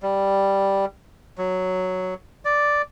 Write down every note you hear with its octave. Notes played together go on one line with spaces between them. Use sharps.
G3
F#3
D5